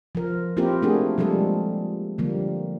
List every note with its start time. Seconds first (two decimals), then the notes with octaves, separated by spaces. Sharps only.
0.15 F3 A#4
0.57 A#3 C4 E4 F4 G4 A#4
0.82 A3 A#3 D4 F#4 G#4
1.18 F3 G3 G#3 A4
2.18 D3 F3 G3 A#3